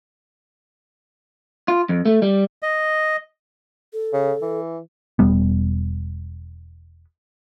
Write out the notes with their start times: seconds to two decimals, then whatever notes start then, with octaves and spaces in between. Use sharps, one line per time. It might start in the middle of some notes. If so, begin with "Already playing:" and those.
1.68 F4
1.89 F2
2.06 A3
2.22 G3
2.63 D#5
3.93 A4
4.13 C#3
4.42 E3
5.19 E1 G3 B3